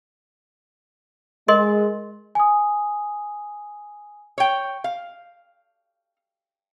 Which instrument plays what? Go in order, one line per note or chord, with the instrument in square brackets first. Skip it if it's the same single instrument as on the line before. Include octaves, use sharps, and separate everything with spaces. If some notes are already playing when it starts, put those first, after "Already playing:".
[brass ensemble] G#3 [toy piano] A#4 D#5 C6
[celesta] G#5 D#6
[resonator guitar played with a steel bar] C#5 G5
F5